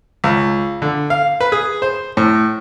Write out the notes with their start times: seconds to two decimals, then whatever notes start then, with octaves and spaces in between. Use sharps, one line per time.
0.24 C#2
0.82 D3
1.10 F5
1.41 B4
1.52 G#4
1.82 C5
2.17 A2